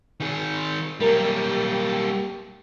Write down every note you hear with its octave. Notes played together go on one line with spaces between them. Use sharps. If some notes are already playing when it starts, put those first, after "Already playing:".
D#3 G#4
F#2 G3 A#3 G4 A#4